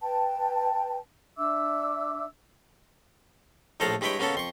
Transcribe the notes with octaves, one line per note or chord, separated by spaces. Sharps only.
B4 G5 A5
D4 E5 D6 E6
A#1 A2 F3 A4 F5 A#5
G2 G#3 E4 B4 C#5 G5
C#3 A#3 B3 C#4 A4
F2 C6 C#6